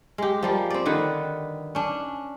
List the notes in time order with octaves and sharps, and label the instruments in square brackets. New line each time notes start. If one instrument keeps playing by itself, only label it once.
[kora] G#3 G4
F3 G3 A#3
C4 D5
D3 D#3 B4
C#4 D4